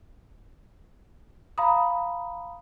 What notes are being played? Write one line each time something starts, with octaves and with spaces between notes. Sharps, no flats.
F5 A#5 B5 D#6